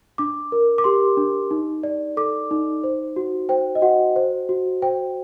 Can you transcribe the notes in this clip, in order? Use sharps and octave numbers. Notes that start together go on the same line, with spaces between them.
D4 D6
A#4
D6
G4 C6
D4
D#4
D5
A4 D6
D#4
C5
F#4
C5 G5
D#5
F#4 F#5
C5
F#4
C5 G5